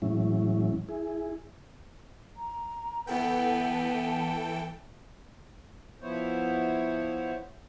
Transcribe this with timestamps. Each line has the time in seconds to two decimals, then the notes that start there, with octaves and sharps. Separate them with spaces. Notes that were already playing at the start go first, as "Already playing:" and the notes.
0.02 A2 E3 F#3 G#3 C#4 E4
0.89 E4 G#4
2.37 A#5
3.07 E3 B3 A4 F#5 G5
3.69 A5
6.02 F3 B3 E4 C5 C#5